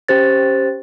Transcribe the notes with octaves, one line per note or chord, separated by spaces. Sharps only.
C#4 G4 C5 A6